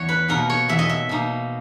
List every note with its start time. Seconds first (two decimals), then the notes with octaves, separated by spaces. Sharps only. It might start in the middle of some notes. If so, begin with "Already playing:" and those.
Already playing: E2 C#5
0.09 B4
0.28 B2 A#3 D#4 A#4
0.50 C#5
0.69 E2 E5
0.79 D#5
0.89 E5
1.09 B2 A#3 D#4